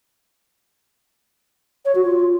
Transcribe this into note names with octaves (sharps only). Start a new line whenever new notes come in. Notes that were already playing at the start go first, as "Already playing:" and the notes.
C#5
F#4
F4